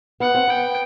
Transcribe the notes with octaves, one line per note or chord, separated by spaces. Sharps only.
B3 F#5
C4
B3 G5